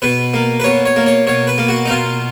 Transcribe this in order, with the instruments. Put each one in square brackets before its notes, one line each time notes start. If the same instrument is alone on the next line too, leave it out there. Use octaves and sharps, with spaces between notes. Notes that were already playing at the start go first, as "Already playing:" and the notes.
[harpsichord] B2 B4
A#3
B4
B2 C#5
C#5
A#3
C#5
B2 C#5
B4
A#3
F#4
D#4
B2 F4